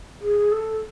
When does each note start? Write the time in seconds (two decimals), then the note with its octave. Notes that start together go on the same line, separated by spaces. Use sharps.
0.21 G#4
0.52 A4